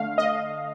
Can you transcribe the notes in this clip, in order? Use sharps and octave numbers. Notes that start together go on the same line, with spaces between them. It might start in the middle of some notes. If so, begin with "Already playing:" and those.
Already playing: D3 A3 F5
D#5